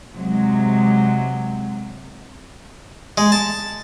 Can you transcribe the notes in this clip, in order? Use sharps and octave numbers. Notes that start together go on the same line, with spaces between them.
C3 F#3 G#3
G#3
A5